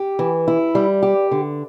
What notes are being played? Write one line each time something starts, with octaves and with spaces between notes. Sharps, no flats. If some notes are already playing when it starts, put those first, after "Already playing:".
Already playing: G4
E3
E4
G3
G4
D3